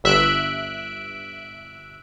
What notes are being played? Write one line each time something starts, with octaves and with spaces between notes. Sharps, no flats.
G1 E5 F#6 D7